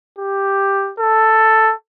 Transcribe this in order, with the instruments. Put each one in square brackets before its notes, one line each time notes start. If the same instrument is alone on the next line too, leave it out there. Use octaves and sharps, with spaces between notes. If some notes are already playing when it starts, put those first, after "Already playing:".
[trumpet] G4
A4